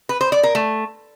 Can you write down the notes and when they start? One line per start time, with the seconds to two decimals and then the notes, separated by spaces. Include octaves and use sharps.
0.09 B4
0.21 C5
0.32 D5
0.43 A#4
0.55 A3